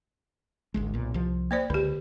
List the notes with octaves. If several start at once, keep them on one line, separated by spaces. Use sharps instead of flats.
G#1 D2 G#3
B1 A#2
C2 F3
A#3 C5 D5
C#2 D3 G4